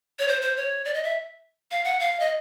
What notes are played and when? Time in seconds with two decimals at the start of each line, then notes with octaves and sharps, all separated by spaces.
0.19 C#5
0.28 C5
0.42 C5
0.57 C#5
0.85 D5
0.94 D#5
1.04 E5
1.71 F5
1.84 F#5
2.00 F5
2.20 D#5